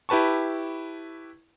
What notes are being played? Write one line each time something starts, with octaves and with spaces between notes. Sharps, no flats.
E4 G4 B4 A5 C#6